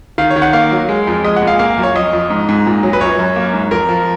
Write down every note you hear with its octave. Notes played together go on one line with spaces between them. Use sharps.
D#3 F5
C#5
D#3
F#5
A#3 F5
F#3
G#3
F2
G#3 D#5
F#5
A#2
F5
A#3 F5
F#2
C#5
F2 D#5
F2
G#2
G#2
A#2
F#3
B4
F#2 C#5
F#2
A#3
G#2
F2 A#4
F3